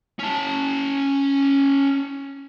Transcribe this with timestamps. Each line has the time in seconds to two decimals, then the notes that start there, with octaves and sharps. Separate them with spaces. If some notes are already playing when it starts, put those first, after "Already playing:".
0.19 C#4 A5